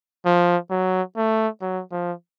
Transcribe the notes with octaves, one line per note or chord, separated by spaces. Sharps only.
F3
F#3
A3
F#3
F3